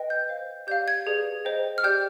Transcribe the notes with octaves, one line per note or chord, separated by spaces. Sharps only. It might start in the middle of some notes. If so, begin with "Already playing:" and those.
Already playing: B4 D#5 G5
G6
C5 F5
G4 D5 F5 G6
G#6
G#4 B4 D5
C5 D#5 G5
F6
G4 D5 G5 G6